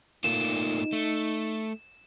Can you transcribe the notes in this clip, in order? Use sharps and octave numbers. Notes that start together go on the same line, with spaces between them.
A3 A#3 D#4 F4 E7
A3